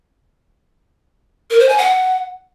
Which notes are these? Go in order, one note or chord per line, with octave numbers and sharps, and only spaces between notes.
A#4
C5
G#5
F#5